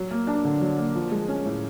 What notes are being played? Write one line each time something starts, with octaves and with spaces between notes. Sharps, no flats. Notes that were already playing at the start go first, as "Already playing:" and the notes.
Already playing: F#3
A#3
D4
D3
F#3
A#3
F3
G#3
C#4
A2